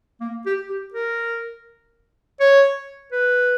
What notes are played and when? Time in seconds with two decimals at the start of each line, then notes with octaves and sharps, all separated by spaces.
0.21 A#3
0.46 G4
0.69 G4
0.94 A#4
2.40 C#5
3.12 B4